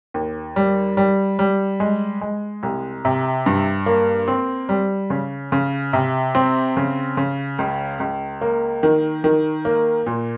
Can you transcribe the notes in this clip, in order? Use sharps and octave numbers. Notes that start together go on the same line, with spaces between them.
D#2
G3
G3
G3
G#3
G#3
C2
C3
G2
A#3
C4
G3
C#3
C#3
C3
C4
C#3
C#3
C#2
C#2
A#3
D#3
D#3
A#3
A#2